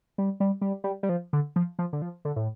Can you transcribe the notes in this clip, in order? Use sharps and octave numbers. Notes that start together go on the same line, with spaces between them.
G3
G3
G3
G3
G3
F3
D3
F3
F3
D3
F3
D3
A2